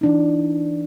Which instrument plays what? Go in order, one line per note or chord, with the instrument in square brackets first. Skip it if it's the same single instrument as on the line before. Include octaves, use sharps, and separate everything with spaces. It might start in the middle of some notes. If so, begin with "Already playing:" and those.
[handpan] E3 D4 D#4